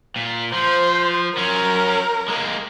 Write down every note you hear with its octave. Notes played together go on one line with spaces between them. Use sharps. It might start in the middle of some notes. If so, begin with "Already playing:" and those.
A#2
F3 C5
F#3 C#4 A#4
G#3 A#3